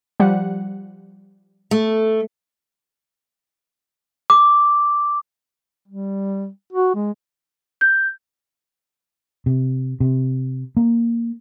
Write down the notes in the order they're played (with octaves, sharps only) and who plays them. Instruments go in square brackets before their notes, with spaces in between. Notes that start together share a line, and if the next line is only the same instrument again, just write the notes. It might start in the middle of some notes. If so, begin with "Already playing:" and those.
[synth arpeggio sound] F3 G3 F#5
[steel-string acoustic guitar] A3
[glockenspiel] D6
[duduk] G3
F#4
G#3
[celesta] G6
[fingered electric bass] C3
C3
A#3